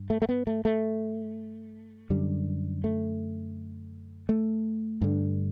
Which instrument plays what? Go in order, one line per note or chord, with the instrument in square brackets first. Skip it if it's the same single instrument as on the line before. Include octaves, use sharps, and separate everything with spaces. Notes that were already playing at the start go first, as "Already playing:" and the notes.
Already playing: [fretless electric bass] G2
A3
A3
B3
A3
A3
F#2 D3 G3
A3
A3
G2 D3